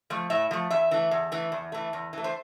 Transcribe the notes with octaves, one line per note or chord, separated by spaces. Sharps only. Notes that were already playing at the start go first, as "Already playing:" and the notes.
F3 A3
A2 E5
F3 A3
E2 E5
E3 A3
E2
E3 A3
E2
E3 A3
E2
E3 A3
C5